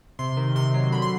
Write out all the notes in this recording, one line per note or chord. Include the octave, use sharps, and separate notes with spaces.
C3 C6
D#3
C3 C6
F#3
D3 B5
C6